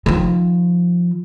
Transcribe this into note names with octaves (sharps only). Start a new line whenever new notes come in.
D#3 F3